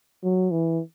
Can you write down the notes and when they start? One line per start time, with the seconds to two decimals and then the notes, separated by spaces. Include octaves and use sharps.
0.24 F#3
0.51 E3